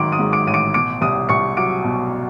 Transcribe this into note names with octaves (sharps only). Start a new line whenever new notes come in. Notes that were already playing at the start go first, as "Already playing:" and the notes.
Already playing: A1 G#2 D#3 F#3 C6 D6 D7
D#6 D#7
G#2
D6 D7
A1 D#7
D6 D7
B2 D6 D7
C2 D#6 D#7
C2 C#6 C#7
F#3 D6 D7
B2